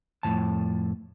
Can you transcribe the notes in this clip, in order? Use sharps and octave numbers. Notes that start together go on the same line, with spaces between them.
F2 A2 C#3 A5